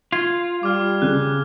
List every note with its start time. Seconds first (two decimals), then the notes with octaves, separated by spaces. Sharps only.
0.12 F4 G#6
0.63 G3 D6 F6
1.02 C#3 F#6